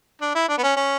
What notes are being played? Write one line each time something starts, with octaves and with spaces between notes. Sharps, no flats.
D4
E4
D4
B3
C#4
C#4